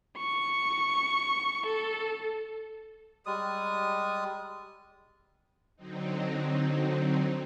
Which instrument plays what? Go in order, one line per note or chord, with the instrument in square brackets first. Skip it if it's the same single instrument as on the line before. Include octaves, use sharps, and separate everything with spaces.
[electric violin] C#6
A4
[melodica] G3 G#3 D#6
[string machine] D3 F#3 C4 D#4